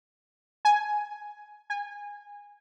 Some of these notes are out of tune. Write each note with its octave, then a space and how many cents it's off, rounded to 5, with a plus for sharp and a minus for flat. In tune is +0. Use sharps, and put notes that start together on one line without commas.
G#5 +5
G#5 -25